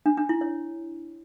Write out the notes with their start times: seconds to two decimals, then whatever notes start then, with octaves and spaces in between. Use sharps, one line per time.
0.06 D4
0.17 D4
0.29 E4
0.41 C#5